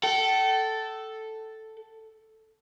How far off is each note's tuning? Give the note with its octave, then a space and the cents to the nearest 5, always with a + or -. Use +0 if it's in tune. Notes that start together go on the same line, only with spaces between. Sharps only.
A4 +0 G5 -40